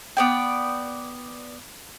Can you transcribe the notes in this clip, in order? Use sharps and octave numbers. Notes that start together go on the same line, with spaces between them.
B3 D5 G5